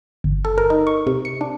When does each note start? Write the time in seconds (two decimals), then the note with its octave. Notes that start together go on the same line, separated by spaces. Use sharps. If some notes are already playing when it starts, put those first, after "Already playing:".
0.24 G1
0.45 A4
0.58 A#4
0.70 D#4
0.87 C#6
1.07 C3
1.25 C#7
1.41 D4